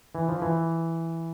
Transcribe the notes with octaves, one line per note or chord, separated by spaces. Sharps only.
E3
F3
E3